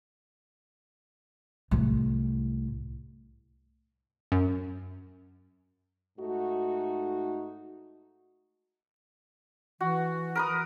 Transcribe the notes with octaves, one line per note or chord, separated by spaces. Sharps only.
C2 A2
F#2
G#2 A3 D#4 F#4
E3 F#4
A#4 B4 D#6